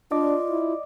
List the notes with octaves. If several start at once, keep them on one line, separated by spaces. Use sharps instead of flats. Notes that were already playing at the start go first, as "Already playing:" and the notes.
D4 F4 D5 D#5 D6
E4